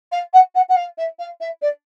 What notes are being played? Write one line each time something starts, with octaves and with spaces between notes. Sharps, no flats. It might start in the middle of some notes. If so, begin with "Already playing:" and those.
F5
F#5
F#5
F#5
F5
E5
F5
E5
D5